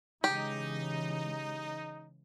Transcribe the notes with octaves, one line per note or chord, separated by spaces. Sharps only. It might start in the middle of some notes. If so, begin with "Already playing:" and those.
C#3 E3 G#3 D#4 G4